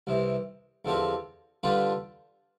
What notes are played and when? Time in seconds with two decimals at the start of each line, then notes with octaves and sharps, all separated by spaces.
0.07 C2 C3 E3
0.85 E2 D3 F3 C4 G4
1.63 D3 G3 D4 F4 B4